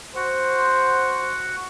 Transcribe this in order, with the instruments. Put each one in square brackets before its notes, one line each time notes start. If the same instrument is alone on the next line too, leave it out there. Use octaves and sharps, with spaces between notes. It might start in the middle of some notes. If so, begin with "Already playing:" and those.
[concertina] F#4 F#5 [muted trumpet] C5